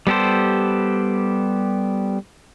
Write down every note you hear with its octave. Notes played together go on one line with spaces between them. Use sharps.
G3 B3 G4 A4 C5